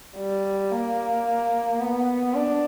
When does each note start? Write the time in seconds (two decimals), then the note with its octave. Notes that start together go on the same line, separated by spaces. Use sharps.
0.17 G3
0.71 A#3
1.80 B3
2.34 D4